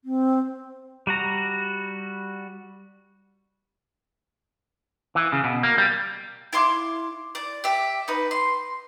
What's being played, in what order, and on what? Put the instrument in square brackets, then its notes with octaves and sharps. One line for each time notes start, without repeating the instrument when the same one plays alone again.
[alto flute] C4
[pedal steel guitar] G3 F#4 A#5
[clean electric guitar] E3
C#3
B2
A#3
G3
[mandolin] E4 F5 C6 D6
D5
G4 E5
D#4 B4
C6